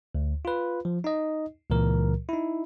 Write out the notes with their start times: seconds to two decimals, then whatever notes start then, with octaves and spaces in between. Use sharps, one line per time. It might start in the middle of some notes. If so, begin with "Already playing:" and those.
0.15 D2
0.45 F4 B4
0.85 F3
1.04 D#4 D#5
1.70 C#2 A#2 E3 A#4
2.29 D#4 E4